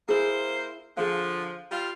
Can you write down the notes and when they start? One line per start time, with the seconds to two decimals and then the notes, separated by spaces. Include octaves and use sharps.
0.09 A#3 E4 G#4 C5
0.97 D3 F3 G#4 F5
1.72 G3 F4 F5